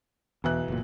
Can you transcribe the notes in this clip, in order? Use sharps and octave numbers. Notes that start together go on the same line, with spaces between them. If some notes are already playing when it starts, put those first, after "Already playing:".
B1 E2 E3 F#6
F#1 A#2